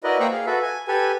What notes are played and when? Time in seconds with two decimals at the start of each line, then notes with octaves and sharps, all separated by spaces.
0.04 E4 F#4 A#4 B4 D5 D#5
0.20 A#3 C5 G5 A#5 B5 C#6
0.32 G#4 F5
0.46 F#4 A4 B4 E5
0.62 G#5
0.88 G4 A4 B4 G#5